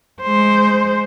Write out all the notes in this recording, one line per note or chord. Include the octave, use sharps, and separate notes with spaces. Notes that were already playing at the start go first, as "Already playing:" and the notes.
G#3 C5